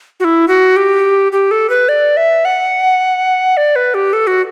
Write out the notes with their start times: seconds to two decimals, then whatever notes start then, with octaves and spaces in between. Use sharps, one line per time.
0.20 F#4
0.24 E4
0.48 F#4
0.76 G4
1.32 G4
1.51 A4
1.70 B4
1.89 D5
2.17 E5
2.45 F#5
3.57 D5
3.76 B4
3.94 G4
4.13 A4
4.27 F#4